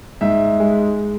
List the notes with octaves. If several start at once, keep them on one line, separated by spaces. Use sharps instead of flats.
G#2 E5
G#3